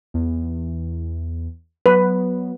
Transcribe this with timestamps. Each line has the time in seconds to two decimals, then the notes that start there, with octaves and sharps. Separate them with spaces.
0.14 E2
1.86 F#3 B3 B4